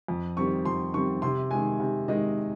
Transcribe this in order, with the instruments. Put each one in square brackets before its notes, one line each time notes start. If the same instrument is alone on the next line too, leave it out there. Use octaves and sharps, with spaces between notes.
[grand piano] F2
D#3 G3 C4 C#6
F2 C6
D#3 G3 C4 C#6
C3 C6
D#3 G#3 G#5
C3
D#3 G#3 D#5